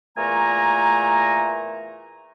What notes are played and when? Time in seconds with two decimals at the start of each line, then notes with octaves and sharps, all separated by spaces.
0.16 E2 A#2 A3 G#5 A#5